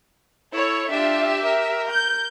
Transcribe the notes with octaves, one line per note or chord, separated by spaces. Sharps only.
E4 A4 C#5
D4 F4 G4 E5
A#4
G6